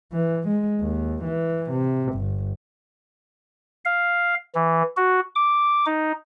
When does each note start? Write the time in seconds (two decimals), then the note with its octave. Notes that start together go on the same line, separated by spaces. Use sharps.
0.12 E3
0.47 G#3
0.81 D#2
1.24 E3
1.71 C3
2.14 G1
3.85 F5
4.55 E3
4.97 F#4
5.35 D6
5.86 D#4